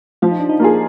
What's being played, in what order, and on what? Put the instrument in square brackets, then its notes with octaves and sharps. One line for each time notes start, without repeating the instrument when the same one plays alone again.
[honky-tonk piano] F3 [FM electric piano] F4
[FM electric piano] D#4
D4
D#4
[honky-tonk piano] A#3 F4 G#4